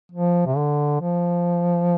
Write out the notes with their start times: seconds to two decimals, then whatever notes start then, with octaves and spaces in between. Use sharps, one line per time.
0.12 F3
0.46 C3
0.56 D3
1.00 F3